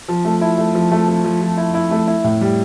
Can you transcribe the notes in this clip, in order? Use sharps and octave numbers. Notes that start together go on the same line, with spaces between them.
F3
A3
E4
A3
F3
A3
F3
F3
F3
E4
E4
A3
E4
A2
G3